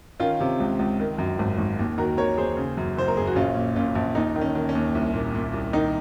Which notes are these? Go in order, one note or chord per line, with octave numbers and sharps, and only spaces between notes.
D#3 C#4 F4
C3
C#2
C#2
D#3
F#2
G#1
G#1
D#2
D#3 F#4 A#4
D#3 A#4 C#5
D#2 G#4 C5
C#3
F#2
F#1 C5
A#4
F#1 G#4
F#4
A#1 C#4 F4
A#2
A#2 C#4 F4
A#1
D#2 D#4
D#3
C#4
D#3
C#4
D#2
C2
A#2
A#2
C2
D#3 D#4